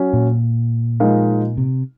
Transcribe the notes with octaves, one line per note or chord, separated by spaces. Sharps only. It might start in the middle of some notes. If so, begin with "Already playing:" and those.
Already playing: F#3 C#4
A#2
F3 G#3 D#4 A#4 F5
C3